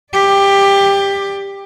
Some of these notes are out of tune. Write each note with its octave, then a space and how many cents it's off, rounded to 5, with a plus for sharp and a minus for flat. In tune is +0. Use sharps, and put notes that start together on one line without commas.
G4 +15 D5 +0